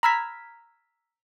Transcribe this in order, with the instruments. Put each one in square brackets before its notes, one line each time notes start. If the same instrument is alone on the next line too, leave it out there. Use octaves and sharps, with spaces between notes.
[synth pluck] A#5 B5 E6 F6 G#6 B6